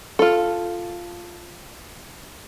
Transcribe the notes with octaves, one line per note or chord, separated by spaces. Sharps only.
F4 A4